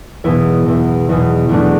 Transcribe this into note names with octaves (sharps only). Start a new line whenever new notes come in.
E2 B2 B3 E4
E2 B2
E2 B2
E2 B2 A3 D4
A3